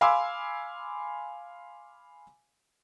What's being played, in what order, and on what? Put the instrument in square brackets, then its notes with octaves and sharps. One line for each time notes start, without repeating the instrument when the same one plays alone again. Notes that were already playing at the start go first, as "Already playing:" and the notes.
[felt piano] F5 G#5 B5 C6 D6 E6